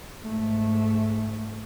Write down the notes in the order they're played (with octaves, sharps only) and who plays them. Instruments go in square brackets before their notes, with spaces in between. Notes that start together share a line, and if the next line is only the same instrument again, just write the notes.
[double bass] G#2 A3